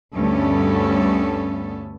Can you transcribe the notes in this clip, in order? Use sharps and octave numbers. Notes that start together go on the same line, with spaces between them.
D2 G2 B3 C#4 A4